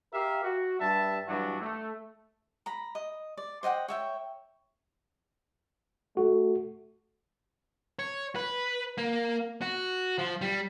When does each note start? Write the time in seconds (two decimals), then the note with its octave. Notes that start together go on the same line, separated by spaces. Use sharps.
0.14 G4 A#4 E5 F5
0.44 F#4
0.80 G2 G3 E5 A5
1.28 G2 E3 F#3 D4 F#4
1.62 A3
2.66 A#5 B5
2.95 D#5
3.37 D5
3.63 C5 D#5 F#5 G5
3.88 C#5 E5 G5
6.17 A3 F#4
7.99 C#5
8.36 B4
8.98 A#3
9.62 F#4
10.18 F3
10.41 G3